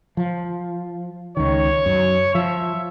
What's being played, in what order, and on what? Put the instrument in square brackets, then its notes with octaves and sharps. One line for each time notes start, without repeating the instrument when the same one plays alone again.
[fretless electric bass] F3
[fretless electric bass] C#2 D#3 [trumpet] C#5
[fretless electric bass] F#2
[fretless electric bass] F3 [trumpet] E5